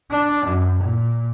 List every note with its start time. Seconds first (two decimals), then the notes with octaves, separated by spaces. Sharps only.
0.11 D4
0.46 F#2
0.81 A#2